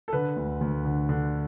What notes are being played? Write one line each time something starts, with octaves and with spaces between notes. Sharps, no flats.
A4
D3 B4
D2
D2
D3
D3